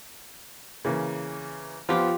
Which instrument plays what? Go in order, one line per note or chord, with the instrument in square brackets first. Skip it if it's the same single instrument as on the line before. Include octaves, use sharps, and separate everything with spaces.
[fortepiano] C#3 E3 A#3
[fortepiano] F3 B3 [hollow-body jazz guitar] F4 G4